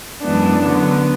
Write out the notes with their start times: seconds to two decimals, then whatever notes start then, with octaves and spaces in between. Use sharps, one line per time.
0.21 F#2 E3 G#3 B3 D4
0.62 D3 F#3 B3